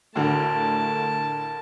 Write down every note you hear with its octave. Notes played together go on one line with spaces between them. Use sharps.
D2 A2 D3 A3 A#4 A5